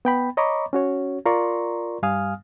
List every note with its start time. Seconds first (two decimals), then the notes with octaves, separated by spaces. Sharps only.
0.05 B3 G5 B5
0.37 C#5 D#5 A#5 B5 C#6 D6
0.73 C#4 F#4 C#5
1.26 F4 A#4 D5 A#5 C6 C#6
2.02 G2 G3 F5 G#5 D#6 F6